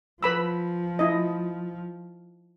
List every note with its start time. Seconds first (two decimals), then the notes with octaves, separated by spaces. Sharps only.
0.23 F3 B4 B5 E6
0.99 E4 D#5